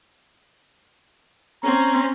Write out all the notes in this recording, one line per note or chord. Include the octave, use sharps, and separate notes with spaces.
C4 C#4 A#5